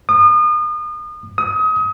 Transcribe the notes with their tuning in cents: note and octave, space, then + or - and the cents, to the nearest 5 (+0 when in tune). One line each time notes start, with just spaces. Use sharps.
D#6 -35
D#6 +30